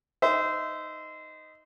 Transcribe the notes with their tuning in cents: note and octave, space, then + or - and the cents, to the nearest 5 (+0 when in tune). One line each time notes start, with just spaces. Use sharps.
D#4 +0 C5 -25 E5 +0